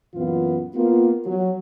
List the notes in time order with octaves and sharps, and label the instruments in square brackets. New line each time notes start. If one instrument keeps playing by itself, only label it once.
[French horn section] F#2 A#2 E3 B3 F4
A#3 B3 F4
F#3